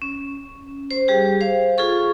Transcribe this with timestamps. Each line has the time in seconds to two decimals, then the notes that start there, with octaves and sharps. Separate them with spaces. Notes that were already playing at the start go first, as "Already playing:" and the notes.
0.02 C#4
0.91 C5
1.08 G3 G4 G#4
1.41 C5 F5
1.78 F4 G#4 A4 C#6